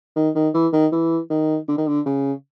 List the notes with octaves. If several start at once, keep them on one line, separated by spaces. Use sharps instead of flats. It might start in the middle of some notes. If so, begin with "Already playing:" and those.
D#3
D#3
E3
D#3
E3
D#3
D3
D#3
D3
C#3